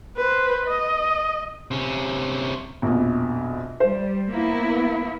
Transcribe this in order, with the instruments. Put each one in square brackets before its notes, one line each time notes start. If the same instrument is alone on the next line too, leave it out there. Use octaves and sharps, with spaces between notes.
[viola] B4 C5
D#5
[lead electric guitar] C3 C#4
[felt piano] A#1 F2 B2
[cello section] G3 [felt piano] C5
[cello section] A#3 B3 E4